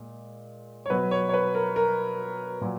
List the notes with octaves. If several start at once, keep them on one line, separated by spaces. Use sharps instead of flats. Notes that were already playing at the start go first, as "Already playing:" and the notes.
Already playing: A#2 G#3
C#5
B2 F#3 B4
C#5
C#5
B4
A#4
A#4
A#2 F#3